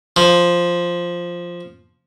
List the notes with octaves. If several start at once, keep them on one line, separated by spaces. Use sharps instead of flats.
F3